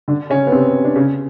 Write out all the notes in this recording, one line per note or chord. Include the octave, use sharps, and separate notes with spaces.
D3 D4
C#3 C#4
B3
C3 C4
D4
C#3 C#4